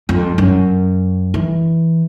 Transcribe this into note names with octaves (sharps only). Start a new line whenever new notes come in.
F2
F#2
E3